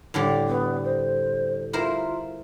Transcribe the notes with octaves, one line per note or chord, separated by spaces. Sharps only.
A2 D3 G3
B3
C5
E4 F4 A#4 C5